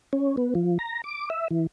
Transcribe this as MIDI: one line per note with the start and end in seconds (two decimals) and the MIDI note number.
0.13 0.36 61
0.37 0.54 59
0.55 0.78 53
0.79 1.02 82
1.04 1.29 86
1.30 1.48 76
1.51 1.67 52